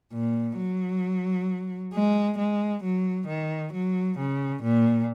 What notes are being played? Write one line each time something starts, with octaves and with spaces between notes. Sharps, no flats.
A#2
F#3
G#3
G#3
F#3
D#3
F#3
C#3
A#2